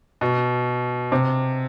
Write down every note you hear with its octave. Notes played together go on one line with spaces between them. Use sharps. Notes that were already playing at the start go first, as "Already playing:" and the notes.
B2
C3